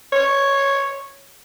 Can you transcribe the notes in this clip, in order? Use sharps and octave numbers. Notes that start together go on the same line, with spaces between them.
C#5